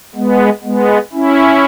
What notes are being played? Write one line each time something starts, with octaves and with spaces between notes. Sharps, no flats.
G#3 B3
G#3 B3
C#4 E4